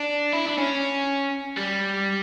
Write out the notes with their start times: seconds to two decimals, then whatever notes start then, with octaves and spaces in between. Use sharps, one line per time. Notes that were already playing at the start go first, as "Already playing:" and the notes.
Already playing: D4
0.33 E4
0.46 D4
0.58 C#4
1.57 G3